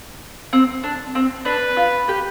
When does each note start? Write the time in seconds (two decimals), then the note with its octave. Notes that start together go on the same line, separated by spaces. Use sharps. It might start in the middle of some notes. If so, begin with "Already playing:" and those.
0.53 C4
0.83 D4
1.15 C4
1.45 D4 B4
1.77 F4
2.08 G4 B4